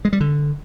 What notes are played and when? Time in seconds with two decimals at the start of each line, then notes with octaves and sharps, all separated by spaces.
0.05 G#3
0.13 G3
0.21 D3